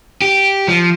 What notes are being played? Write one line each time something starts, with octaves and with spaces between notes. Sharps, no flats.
G4
F3